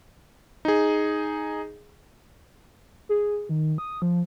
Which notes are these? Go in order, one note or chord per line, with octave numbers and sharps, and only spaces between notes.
D#4 G#4
G#4
D#3
D#6
F3